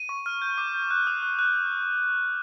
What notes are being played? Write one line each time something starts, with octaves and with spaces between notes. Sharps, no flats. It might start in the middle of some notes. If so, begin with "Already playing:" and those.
Already playing: D#7
C#6
F6
G6
D6
G6
F#6
D#6
F#6
F#6